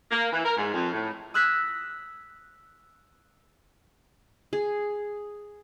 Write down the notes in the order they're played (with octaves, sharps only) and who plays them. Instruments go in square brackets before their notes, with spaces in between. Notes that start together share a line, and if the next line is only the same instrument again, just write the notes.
[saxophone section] A#3
E3
A#4
G#2
F2
A2
[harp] D#6 E6 F#6 G#6 A#6 B6
[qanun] G#4